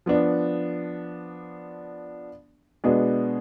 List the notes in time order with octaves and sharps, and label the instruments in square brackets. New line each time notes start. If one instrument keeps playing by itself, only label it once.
[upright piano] F3 B3 D4
B2 G#3 B3 D4